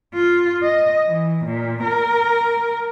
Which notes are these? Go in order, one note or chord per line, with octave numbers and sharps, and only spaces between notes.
F4
D#5
E3
A#2
A#4